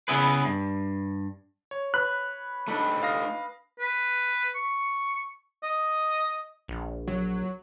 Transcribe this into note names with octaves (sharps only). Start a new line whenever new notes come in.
C#3 B3 E4 G#4 B4
G2
C#5
B4 F#6
A3 D4 D#4 B5
F5 D#6 A#6
B4
C#6
D#5
A#1
F#3